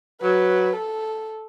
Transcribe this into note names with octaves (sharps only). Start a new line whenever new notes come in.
F#3 B4
A4